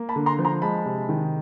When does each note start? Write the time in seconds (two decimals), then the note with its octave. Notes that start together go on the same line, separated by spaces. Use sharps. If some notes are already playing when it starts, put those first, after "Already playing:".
Already playing: A#3
0.09 A5 B5
0.16 D3
0.26 A#5 C6
0.39 F3
0.44 A#5 C6
0.62 G#3 A5 B5
0.86 C3
1.09 D#3